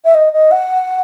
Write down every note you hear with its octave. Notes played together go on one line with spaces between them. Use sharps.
E5
D#5
D#5
F#5